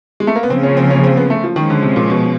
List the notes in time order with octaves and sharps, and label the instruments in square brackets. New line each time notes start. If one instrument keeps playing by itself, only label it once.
[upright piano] G#3
A3
A#3
B3
[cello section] C#3 F3 A#3 [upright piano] C4
[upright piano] C#4
C4
C#4
C4
B3
A3
F3
[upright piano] D#3 [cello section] F3 G#3 C#4
[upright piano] D3
C3
A#2
B2